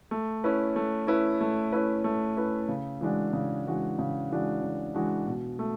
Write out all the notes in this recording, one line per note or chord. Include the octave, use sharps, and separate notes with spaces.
A3
C#4 E4 B4
A3
C#4 E4 B4
A3
C#4 E4 B4
A3
C#4 E4 B4
C#3
E3 G#3 D4 F#4
C#3
E3 G#3 D4 F#4
C#3
E3 G#3 D4 F#4
C#3
E3 G#3 D4 F#4
B2
A3